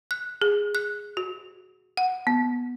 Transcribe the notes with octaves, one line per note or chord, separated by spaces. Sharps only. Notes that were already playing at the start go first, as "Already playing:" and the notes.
F#6
G#4
F#6
F#4
F#5
B3